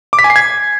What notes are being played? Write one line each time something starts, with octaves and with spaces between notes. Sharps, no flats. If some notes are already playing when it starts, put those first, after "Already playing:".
D6
B6
G#5
C7
G#6